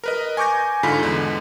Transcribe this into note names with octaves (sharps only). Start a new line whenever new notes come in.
A#4 B4 D#5
G#5 C#6 D6 G6 A#6
G#2 D3 F4 B5 B6
E2 D3 G#3